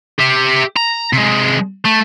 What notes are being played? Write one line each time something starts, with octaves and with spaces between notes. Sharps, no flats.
G4 E5
A#5
C3 G#3
A3